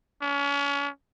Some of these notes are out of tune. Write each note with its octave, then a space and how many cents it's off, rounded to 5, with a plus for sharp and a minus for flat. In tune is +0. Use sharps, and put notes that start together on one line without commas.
C#4 +35